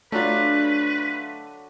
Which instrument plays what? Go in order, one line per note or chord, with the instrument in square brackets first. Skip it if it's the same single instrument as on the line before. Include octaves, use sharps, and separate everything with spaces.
[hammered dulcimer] D3 F#3 D4 [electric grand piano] A3 F4 [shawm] B4